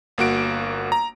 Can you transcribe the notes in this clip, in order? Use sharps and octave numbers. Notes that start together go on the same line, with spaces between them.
G1 A#3 F#4 D7
A#5